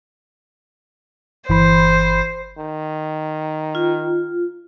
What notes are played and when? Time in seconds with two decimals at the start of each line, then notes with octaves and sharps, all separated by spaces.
1.49 G1 E3 C5 B5
2.58 D#3
3.75 F4